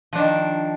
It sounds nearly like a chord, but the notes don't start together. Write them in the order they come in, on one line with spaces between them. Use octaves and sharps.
F3 D4 D#3